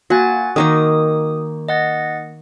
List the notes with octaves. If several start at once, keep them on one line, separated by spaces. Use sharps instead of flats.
A#3 F#4 G#5 A6
D#3 A#3 D#4 D#6
D#5 F#5 A6